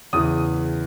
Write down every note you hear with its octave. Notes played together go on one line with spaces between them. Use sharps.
E2 C#3 E3 D#6